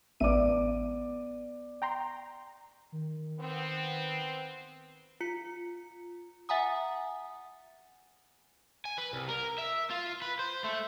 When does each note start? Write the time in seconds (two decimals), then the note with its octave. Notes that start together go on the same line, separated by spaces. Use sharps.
0.20 A1 B3 D5 E5 D6 D#7
1.82 G5 A#5 C6
2.92 D#3
3.40 B3 C4
5.21 F4 C#7
6.49 E5 F#5 G#5 A#5 D#6
8.85 G#5
8.98 B4
9.13 C2
9.29 A#4
9.58 E5
9.90 F4
10.22 B4
10.39 C5
10.64 A3